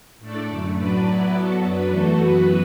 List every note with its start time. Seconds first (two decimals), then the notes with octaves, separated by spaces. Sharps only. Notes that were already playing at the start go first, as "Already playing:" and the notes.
0.19 A2 A3 D4 A4 D5
0.48 F#2 D3 A3
0.76 A2 F#3 D4 B4 D5
1.05 F#3 B3 E4 B4 D5
1.32 F#3 B3 F#4 A4
1.61 F#2 F#3 D4 B4
1.90 E2 E3 A3 F#4 A4
2.17 F#2 E3 B3 F#4 B4